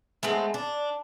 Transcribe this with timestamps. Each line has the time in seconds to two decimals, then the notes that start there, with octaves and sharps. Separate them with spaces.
0.23 G#3 A3 B3 C4
0.54 D4